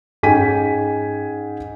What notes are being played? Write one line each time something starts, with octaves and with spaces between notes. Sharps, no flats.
G#2 C#4 G5 G#5 B6 D#7